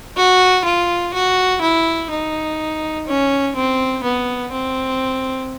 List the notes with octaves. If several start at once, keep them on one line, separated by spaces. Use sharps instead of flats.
F#4
F4
F#4
E4
D#4
C#4
C4
B3
C4